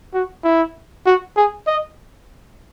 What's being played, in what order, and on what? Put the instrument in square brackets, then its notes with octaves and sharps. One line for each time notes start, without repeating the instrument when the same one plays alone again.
[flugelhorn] F#4
E4
F#4
G#4
D#5